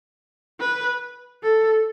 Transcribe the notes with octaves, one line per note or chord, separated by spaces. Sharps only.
B4
A4